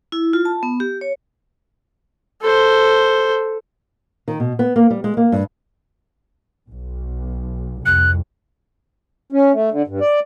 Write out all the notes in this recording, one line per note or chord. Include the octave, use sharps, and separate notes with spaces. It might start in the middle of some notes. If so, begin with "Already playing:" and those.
E4
F4
A5
B3
G4
C#5
A4 C5
D#3
B2
B3
A#3
G3
G#3
A#3
G2
B1
C2 F2 F#6
C#4
A3
D3
G2
D5